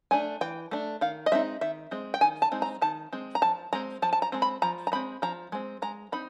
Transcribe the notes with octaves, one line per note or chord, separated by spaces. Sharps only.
A3 D4 G#5
E3 G5
A3 D4
D#3 F5
D#5
G#3 C4 D#4 E5
D#3 E5
G#3 C4
G5
D#3 G#5
A5
G#3 C4 D#4
A#5
D#3 A5
G#3 C4
A#5
F3 A5
G#3 C4 A#5
F3 A5
A5
A#5
G#3 C4
B5
F3 A#5
A#5
G#3 C4 B5
F3 A#5
G#3 C4
G#3 A#5
C4 D#4 B5